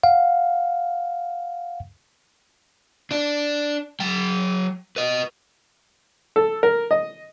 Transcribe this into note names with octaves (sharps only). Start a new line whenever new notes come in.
F5 F#5
D4 D5
F#3 G5
B4 D#5
A4
A#4
D#5